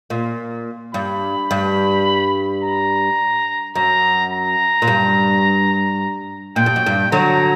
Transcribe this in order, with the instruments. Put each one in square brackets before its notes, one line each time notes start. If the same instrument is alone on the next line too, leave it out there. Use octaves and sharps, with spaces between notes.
[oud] A#2
[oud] G2 [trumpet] B5
[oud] G2
[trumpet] A#5
[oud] F#2 [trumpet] A#5
[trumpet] A#5
[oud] A#2
G2
[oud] A#2 [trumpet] G5
[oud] G2
F#2
G2
[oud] D3 F#3 [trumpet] A#5